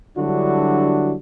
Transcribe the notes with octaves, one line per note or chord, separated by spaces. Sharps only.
D3 F#3 G3 D4 E4 F#4